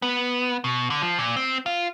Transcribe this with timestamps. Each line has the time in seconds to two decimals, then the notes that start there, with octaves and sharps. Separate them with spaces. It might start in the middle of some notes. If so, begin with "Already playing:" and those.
0.02 B3
0.64 B2
0.90 D3
1.02 F3
1.19 A#2
1.36 C4
1.66 F4